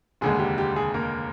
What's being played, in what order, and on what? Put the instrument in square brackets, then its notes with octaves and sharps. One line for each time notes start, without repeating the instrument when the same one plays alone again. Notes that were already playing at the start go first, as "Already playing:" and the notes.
[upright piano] F1 D#2 D3 G#3 G#4
G4
G4
G#4
A#3 A#4